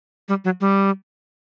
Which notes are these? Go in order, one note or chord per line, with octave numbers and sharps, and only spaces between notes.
G3
F#3
G3